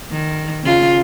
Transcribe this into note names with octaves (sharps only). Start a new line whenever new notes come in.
D#3
C#3 F4